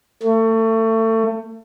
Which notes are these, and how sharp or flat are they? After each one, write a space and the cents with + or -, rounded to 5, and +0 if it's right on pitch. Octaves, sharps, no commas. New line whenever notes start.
A3 +30